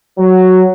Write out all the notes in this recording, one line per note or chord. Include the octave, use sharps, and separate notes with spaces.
F#3